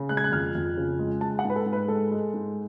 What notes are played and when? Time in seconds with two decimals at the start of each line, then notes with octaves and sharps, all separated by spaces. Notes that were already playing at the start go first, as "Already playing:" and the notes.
Already playing: C#3
0.09 G#3 F#6
0.17 G#6
0.24 F#6
0.32 F2 F6
0.55 F2
0.77 C#3
0.99 G#3
1.21 G#3 A5
1.39 F#5
1.45 G#2 B4
1.56 A4
1.66 G#2
1.73 B4
1.88 G#3 A4
2.11 G#3
2.34 G#2